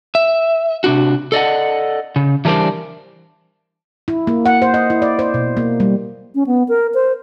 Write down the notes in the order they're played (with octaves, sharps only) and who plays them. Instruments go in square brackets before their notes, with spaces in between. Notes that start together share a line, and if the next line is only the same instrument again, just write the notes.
[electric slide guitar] E5
C3 D4 F#4
A4 D5 D#5 F#5
C#3
E3 G3 D4 A#4 C5 D5
[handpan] E4
A#3
F#5
C5
D#5
E4
D5
C5
B2
A#3
G3
[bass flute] C#4
B3
A#4
C5